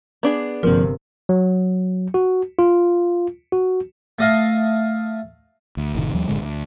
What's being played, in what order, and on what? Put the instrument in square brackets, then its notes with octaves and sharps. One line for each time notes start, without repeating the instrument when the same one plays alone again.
[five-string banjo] B3 D4 G#4
[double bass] G1 C3 [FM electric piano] F3 A#3 C4 [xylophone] A#4
[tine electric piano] F#3
F#4
F4
F#4
[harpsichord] A3 D#5 F5
[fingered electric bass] D2
F#1 A2 C3 D#3
D#2 F3 G3
F#1 A2 D3 G#3
D2